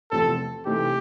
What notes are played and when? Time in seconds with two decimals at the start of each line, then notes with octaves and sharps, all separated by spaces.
0.11 E2 C3 F3 A3 C4 A4
0.65 C3 E3 A3 C4 D#4 G4